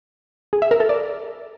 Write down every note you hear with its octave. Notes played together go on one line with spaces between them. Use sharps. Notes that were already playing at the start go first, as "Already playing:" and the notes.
G#4
E5
A#4
A4
D5